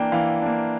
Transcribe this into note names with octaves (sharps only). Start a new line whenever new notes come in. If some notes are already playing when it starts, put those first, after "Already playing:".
Already playing: E3 A#3 D4 G5
E3 F5
A#3 D4